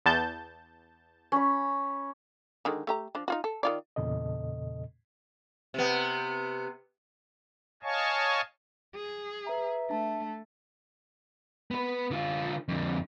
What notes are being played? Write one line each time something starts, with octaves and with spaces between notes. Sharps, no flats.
E2 A5 G6
C#4 B5
D3 D#3 G#3
A3 G4 A#5
F3 D4
D#4 F4 F#4
A4
D#3 F4 D5
E2 A#2 C#3 A4 D#5
C3 B3
C#5 D#5 F5 G#5 A5 C#6
G#4
B4 E5 A#5
A3 D4 A5
B3 B4
D3 F4
F2 D3